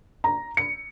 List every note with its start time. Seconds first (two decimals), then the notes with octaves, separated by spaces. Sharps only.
0.24 A#5
0.57 C#7